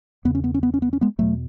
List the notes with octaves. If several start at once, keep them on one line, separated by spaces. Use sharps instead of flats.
E2 C#3 B3
C#4
B3
C#4
B3
C#4
B3
C#4
G#3 B3
E2 B2 F#3 A3